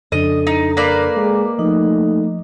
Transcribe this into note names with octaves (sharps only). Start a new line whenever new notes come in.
F2 C#3 D4 A4 D#5
D#4
A#3 B4 D5
G#3
F3 A3 D#4 D#5